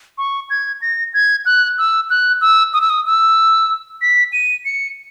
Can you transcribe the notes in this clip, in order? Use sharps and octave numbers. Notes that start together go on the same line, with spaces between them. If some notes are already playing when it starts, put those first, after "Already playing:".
C#6
G#6
A#6
G#6
F#6
E6
F#6
E6
D#6
E6
D#6
E6
B6
D#7
C#7